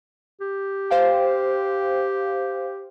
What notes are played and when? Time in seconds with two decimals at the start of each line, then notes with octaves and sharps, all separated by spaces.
0.41 G4
0.91 C5 F5 G5